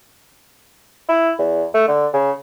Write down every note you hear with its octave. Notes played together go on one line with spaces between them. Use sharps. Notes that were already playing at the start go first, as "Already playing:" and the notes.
E4
E2
A3
D3
C#3